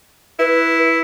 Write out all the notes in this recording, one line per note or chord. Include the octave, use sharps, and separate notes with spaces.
E4 B4